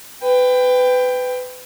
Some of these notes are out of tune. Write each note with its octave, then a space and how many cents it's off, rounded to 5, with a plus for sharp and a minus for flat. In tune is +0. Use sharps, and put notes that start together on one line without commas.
B4 +25 G5 +15